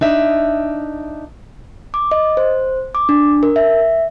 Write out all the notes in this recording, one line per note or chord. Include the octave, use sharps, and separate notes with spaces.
D4 D#4 E5
D6
D#5
C5
D6
D4
A#4
E5